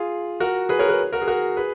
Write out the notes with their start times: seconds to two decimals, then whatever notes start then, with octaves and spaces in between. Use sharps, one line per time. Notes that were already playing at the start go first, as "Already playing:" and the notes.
Already playing: F4 G#4
0.40 F#4 A#4
0.69 G#4 B4
0.79 A#4 C#5
0.89 G#4 B4
1.13 F#4 A#4
1.22 G#4
1.28 F#4 A#4
1.57 G#4 B4